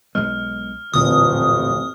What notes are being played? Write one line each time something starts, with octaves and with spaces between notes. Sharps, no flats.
B1 G#3 F6
D1 A1 F2 A#2 D3 D#6